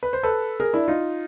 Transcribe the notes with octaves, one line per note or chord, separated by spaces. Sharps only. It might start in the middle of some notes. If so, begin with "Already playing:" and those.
B4
C5
A4 B4
G#4 A#4
D4 E4
D#4 F4